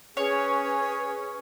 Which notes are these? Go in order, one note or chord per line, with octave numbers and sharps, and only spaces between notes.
C#4 G#4 B4 C#5